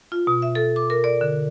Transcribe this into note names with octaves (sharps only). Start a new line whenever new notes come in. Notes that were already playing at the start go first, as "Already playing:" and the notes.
F4
B2
E5
A4
D6
A#4
D5
D3